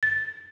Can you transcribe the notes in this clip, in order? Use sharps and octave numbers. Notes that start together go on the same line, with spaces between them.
A6